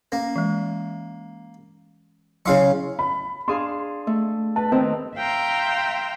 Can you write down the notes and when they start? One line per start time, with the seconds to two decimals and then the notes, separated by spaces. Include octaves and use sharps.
0.12 A#3 C#4
0.36 E3 G#3
2.46 C#3 F#3 E4 F5 C#6
2.99 B5
3.48 D4 G#4 F5 C6
4.07 A3
4.56 B4 A5
4.72 D#3 C4
5.15 E5 F5 G5 A#5 C6